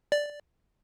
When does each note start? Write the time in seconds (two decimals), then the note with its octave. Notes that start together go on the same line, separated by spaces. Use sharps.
0.12 D5